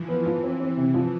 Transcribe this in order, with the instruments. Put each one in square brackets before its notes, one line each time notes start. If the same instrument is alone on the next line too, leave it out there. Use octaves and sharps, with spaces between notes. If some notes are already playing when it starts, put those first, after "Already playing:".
Already playing: [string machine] E3 F3
[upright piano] B3
[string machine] E3 [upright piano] F3
[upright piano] C4
C4
C3
F3